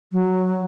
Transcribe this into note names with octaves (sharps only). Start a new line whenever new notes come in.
F#3